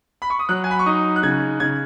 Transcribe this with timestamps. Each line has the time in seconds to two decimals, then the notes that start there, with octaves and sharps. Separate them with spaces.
0.22 B5
0.30 C#6
0.39 D#6
0.49 F#3 F#6
0.64 G#5
0.71 B5
0.79 C#6
0.86 D#4 D#6
1.16 F#6
1.23 C#3 G#6
1.60 C#3 G#6